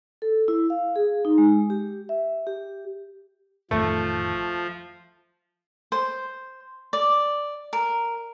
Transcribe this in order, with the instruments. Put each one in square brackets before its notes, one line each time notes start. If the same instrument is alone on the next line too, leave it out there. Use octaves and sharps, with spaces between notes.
[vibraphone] A4
E4
F5
G#4
D#4
G#3
G4
E5
G4
[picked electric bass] A1 F2 D#3 [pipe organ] F3 [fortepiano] A3
[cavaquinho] C5
D5
A#4